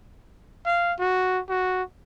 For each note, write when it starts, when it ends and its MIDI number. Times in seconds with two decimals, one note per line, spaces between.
0.66 0.93 77
0.99 1.40 66
1.49 1.83 66